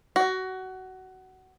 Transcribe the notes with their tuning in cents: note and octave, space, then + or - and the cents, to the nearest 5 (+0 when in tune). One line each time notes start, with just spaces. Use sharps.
F#4 +20